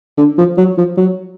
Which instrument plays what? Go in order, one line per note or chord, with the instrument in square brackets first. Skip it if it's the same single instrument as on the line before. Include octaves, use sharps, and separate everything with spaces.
[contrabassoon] D3
F3
F#3
F3
F#3